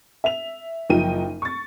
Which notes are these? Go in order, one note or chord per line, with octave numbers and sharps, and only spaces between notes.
E5 F7
F#1 F3 D#4 G5 D#7
C#6 A6